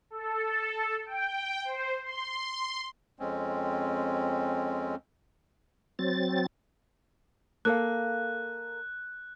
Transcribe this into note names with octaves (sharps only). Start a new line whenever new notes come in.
A4
G5
C5
C6
F2 G#3 C4 C#4
F#3 C4 A6
A#3 A4 F5 F#6